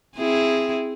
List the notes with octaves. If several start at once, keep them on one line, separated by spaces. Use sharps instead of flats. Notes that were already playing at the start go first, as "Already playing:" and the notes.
C4 E4 G#4